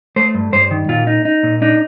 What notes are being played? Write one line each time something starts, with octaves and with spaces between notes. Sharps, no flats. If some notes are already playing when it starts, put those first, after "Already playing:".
A3 C5
G2
G2 C5
D#3
A#2 F4
D#4
D#4
A#2
D4 D#4